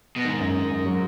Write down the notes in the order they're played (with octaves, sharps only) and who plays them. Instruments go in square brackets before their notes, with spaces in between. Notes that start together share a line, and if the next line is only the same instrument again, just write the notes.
[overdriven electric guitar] B2
[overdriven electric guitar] G#2 [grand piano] D#3
[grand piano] F#2
D#3
F#2
F#3